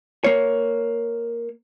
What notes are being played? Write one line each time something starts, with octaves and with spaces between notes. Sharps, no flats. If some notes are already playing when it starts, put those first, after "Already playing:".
A#3 C#5